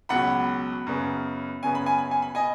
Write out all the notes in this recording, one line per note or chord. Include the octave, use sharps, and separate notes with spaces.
C#2 B2 F#3 F#5 B5
F#2 C#3 B3
F#2 C#3 B3 G#5
B5
G#5
B5
G#5
B5
B2 D#5 G#5